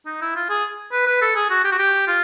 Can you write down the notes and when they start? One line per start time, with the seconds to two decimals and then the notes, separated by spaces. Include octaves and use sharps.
0.06 D#4
0.22 E4
0.36 F4
0.50 G#4
0.92 B4
1.06 B4
1.22 A4
1.36 G#4
1.50 F#4
1.65 G4
1.72 F#4
1.79 G4
2.08 F4